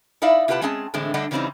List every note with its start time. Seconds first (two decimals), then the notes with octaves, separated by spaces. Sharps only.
0.22 D#4 E4 D5 E5 F5
0.48 C3 F4 G4 B4 F#5 A5
0.61 G#3 C4 C#4 G#4 F#5 A5
0.94 A2 D3 E3 G#3 C4
1.14 D3 G3 A3 D4 D#5 F#5
1.31 C#3 E3 G3 C4 C#4 D#4